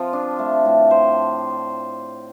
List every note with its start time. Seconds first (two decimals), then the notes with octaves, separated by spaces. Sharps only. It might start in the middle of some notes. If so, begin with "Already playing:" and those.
Already playing: F3 C4 F4 C5
0.13 D4
0.39 A3
0.65 A2
0.91 C5